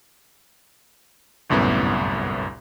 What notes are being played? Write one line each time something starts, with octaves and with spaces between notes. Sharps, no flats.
G1 C2 F#2 A2 B3